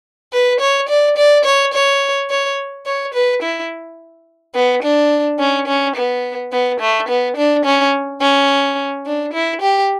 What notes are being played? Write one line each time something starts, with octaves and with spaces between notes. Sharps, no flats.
B4
C#5
D5
D5
C#5
C#5
C#5
C#5
B4
E4
B3
D4
C#4
C#4
B3
B3
A3
B3
D4
C#4
C#4
D4
E4
G4